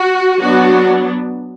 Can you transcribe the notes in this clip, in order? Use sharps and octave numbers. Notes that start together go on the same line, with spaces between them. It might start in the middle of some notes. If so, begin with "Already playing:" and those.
Already playing: F#4
F#3 B3 D4 F#4